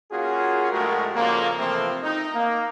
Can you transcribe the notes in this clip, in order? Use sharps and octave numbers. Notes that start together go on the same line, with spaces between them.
A#3 C#4 F4 F#4 G#4
A#1 G#3 A3 F#4 G4 A#4
F2 A#2 C#3 A#3
C3 E3 F3 A3 A#3 C4
D#4
A#3